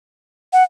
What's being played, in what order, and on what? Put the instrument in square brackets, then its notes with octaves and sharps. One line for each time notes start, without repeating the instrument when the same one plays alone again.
[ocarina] F#5